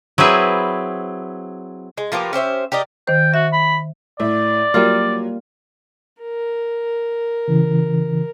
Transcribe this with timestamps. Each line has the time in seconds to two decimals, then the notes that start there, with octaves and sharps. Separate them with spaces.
0.18 F#3 C4 E4 G#4 B4
1.98 G#3
2.12 F3 A#3 B3 G4
2.33 C#4 G4 C5 E5
2.72 G4 A#4 D5 D#5
3.08 D#3 C5 G5
3.34 F#4 E5
3.52 B5
4.20 A2 D5 E5
4.74 F#3 G3 A#3 F4
6.22 A#4
7.48 C#3 E3